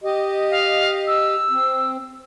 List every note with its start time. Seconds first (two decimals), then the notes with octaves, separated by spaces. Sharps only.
0.04 G4 D#5
0.51 F5
1.07 E6
1.50 C4